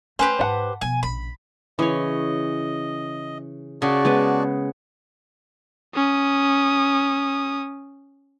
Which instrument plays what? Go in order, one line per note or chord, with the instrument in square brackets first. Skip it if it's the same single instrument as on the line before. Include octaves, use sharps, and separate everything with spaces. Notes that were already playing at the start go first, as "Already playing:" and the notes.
[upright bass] A3 [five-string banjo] C#4 [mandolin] G4 B4 C5
[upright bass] G#2 [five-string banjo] D4 F#5 A5
[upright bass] B2 F3 [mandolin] G#5
[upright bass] A#1 C#3 [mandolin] B5
[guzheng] C#3 [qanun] E3 C#5 [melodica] D#5
[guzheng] C#3 [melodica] F#4 D5 A5
[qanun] G#3 B3 B4
[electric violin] C#4 D#6